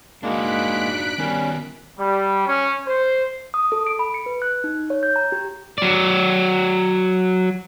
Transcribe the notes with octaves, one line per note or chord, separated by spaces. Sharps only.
G#3 A#3 D4 D#4 F#4 F#6 B6 D7
D#3 G3 B3 C#4 A#4
G3
C#4
C5
D#6
A4
D7
B5
C#7
B4
F#6
D#4
C#5
G6
A#5
G4
F#3 D5